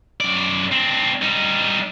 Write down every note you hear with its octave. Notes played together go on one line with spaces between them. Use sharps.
F#2 D5
C4 D4
G3 D#4